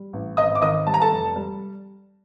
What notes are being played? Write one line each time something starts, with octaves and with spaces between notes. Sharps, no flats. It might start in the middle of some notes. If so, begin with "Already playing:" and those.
Already playing: G3
A1
G#1 D#5 D#6
D6
D#3 D#5 D#6
G3 A5
A#5
A4 A5
F1
G3